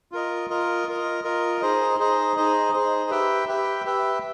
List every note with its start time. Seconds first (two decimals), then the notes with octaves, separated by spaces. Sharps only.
0.12 F4 A#4 D#5
0.50 F4 A#4 D#5
0.87 F4 A#4 D#5
1.24 F4 A#4 D#5
1.61 D#4 G#4 C5 D#5
1.99 D#4 G#4 C5 D#5
2.36 D#4 G#4 C5 D#5
2.73 D#4 G#4 C5 D#5
3.10 G4 B4 E5 G5
3.48 G4 B4 E5 G5
3.85 G4 B4 E5 G5